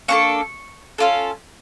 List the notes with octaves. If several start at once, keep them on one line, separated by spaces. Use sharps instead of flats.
A#3 D4 A4 C#6
C#4 F4 A4